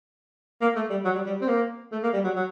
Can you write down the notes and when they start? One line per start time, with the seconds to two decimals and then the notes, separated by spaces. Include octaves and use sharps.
0.61 A#3
0.76 A3
0.90 G3
1.05 F#3
1.15 G3
1.26 G3
1.41 C4
1.48 A#3
1.92 A3
2.03 A#3
2.13 G3
2.24 F#3
2.36 F#3